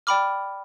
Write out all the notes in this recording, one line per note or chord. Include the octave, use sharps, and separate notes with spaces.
D5 G5 B5 D6 F6